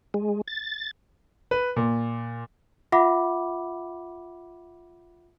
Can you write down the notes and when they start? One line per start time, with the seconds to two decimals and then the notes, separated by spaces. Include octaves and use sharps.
0.14 G#3
0.47 A6
1.51 B4
1.76 A#2
2.92 F4 E5 F#5 B5 D6